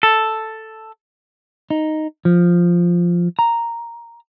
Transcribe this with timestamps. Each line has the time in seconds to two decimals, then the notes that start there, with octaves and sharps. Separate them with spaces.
0.03 A4
1.70 D#4
2.25 F3
3.39 A#5